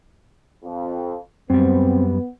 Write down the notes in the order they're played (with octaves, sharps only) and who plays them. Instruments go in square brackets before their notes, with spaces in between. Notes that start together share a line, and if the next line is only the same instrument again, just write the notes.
[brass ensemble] F2
[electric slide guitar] F#2 G3 [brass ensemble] B3 [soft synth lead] C4